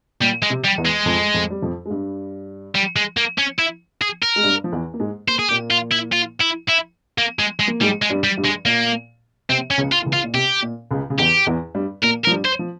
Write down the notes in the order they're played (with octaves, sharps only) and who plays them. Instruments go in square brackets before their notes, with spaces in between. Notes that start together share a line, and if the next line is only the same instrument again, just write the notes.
[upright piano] A#2 [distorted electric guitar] G3
[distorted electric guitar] G#3
[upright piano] C3
[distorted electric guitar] G3
[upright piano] E2 E3
[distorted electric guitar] G#3
[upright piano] F2 F3
F2 F3
G3
F2 F3
G#3
G2 G3
[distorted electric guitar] G3
G#3
A#3
C#4
E4
G#4
A#4
[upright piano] G#3
G2 G3
F3
E2 E3
A#3
G#2 G#3
[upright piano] A#3 [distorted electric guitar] C5
[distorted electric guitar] G#4
[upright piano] A#2 A#3 [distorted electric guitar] G4
[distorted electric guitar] F4
E4
F4
E4
E4
A#3
G#3
G#3
[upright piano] A#3
[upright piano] G#2 G#3 [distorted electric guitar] G3
[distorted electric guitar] G#3
[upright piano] G2 G3
[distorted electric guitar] G3
[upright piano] G2 G3
[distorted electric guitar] G#3
[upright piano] A#2 [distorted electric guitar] A#3
[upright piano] C3 [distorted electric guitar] C4
[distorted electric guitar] C#4
[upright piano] C#2 C#3
[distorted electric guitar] F4
[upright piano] E3
C#2 C#3
[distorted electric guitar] F4
[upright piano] A#2
[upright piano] C3 [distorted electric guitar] G4
[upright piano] A#2
C#2 C#3
C#3
[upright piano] E2 E3 [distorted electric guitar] G4
[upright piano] E2 E3
G2 G3
[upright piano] A#2 A#3 [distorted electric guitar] A#4
[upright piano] F3 [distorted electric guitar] A#4
[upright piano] G2 G3
[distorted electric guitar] C5
[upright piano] F3